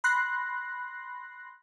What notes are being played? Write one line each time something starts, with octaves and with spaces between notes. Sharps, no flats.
B5 C6 F#6 A#6 C7